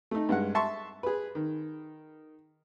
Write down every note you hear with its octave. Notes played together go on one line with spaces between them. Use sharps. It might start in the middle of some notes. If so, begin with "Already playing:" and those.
A3 D#4
G2 G#3 F#5
E5 A5 C6 C#6
G#4 B4
D#3